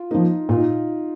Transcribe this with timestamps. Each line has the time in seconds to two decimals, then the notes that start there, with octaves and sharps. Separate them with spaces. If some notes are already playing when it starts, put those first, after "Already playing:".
Already playing: F4
0.11 F3 A#3 D#4
0.49 A#2 F4
0.57 D#4